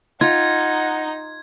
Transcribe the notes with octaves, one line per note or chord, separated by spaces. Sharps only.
D#4 F4 F#5 G#6